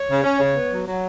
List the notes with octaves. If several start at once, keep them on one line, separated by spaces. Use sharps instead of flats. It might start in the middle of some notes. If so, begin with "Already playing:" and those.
Already playing: C#5
C#3
C#4
C#3
B3
F#3
F#3